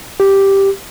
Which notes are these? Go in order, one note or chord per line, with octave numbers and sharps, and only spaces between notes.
G4